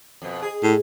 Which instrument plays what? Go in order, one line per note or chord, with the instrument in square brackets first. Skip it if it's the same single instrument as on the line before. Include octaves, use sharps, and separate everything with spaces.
[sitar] F2 B2
G#4
[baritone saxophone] A2